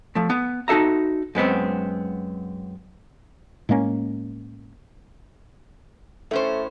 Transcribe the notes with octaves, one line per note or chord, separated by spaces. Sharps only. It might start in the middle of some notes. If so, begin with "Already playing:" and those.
F3 A3
B3
D#4 F#4 A4 E5 A#5
F#2 G#3 B3 C4
A2 G#3 A#3 C#4
A2 A3 C#4 C5